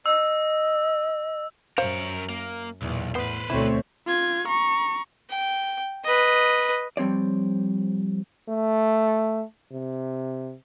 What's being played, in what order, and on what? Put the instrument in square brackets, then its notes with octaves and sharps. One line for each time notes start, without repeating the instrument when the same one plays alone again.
[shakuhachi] D#5 [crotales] E6
[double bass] F#2 [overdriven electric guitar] A#4 C#5 [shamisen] C5 F5
[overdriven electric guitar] A#3
[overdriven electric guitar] B1 [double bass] E2 A#2
[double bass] A2 [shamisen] B3 [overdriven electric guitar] B4 C5
[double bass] D2 B2 [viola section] A3 C4 C#5 [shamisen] E4
[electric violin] F4 G#6
A#5 C#6
[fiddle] G5
B4 D#5
[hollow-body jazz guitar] F3 G3 C4 C#5 D5
[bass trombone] A3
C3